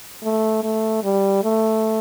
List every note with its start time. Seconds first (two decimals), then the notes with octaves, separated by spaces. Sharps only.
0.23 A3
0.63 A3
1.03 G3
1.43 A3